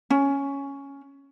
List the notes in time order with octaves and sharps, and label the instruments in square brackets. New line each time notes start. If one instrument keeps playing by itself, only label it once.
[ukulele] C#4